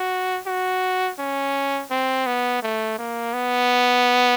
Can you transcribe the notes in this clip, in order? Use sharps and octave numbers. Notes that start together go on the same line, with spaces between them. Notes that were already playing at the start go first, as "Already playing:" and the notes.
Already playing: F#4
F#4
C#4
C4
B3
A3
A#3
B3